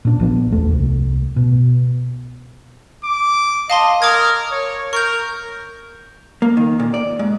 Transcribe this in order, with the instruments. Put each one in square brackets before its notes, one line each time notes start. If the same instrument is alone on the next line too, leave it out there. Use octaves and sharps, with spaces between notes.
[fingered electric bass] A#2 D4
A#1 F3 B3 D4
F1 D#2 A3
C2
B2
[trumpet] D6
[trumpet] D#5 [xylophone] F5 A5 C6
[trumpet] A#4 [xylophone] D6 D#6 G#6
[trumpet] C#5
[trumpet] A#4 [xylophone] C#6 G6
[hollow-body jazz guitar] A#3
D#3
A#2
D5
G#2